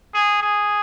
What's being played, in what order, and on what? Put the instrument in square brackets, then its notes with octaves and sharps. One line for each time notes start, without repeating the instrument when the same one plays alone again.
[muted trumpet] G#4
G#4